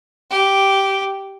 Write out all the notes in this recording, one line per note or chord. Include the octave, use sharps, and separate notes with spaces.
G4